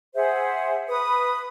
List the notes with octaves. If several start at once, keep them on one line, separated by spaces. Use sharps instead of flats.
G#4 C5 E5 F#5
B4 D#6